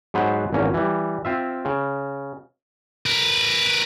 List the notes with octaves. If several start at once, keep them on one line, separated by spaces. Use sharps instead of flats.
G#2 F#3 B3 B4 C5 F#5
G#1 E2 A#3 C#4 A#5
E3 G3
C4 F4 E5
C#3
A#4 B4